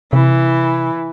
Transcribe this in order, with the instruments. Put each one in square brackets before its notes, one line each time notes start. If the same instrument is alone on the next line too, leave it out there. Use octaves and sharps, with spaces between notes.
[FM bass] C3 [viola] E3